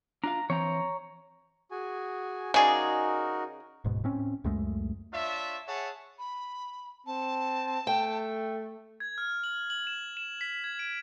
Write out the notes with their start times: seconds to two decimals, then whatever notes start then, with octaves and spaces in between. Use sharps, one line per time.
0.24 D4 F4 F5 A#5
0.50 E3 C4 C#5 A#5
1.71 F#4 G#4 G#5
2.54 C#3 D#4 F#4 G#4 A#4 D5
3.84 D1 G#2 B2
4.04 A2 C4 C#4
4.44 C#2 F#2 G#3 A3
5.12 D4 F4 C#5 E5
5.67 G#4 C#5 E5 F#5 A5
6.19 B5
7.07 C4 A5
7.87 A3 G5
9.00 G#6
9.18 F6
9.44 F#7
9.70 F#7
9.87 E7
10.17 E7
10.41 B6
10.64 G#6
10.79 D7